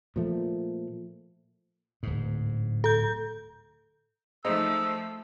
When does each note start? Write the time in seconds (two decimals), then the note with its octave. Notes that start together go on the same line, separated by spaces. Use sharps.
0.16 A#2 F3 A3
2.03 D1 G#2
2.84 A4 G6
4.44 F3 G#3 A3 C4 D#4 E6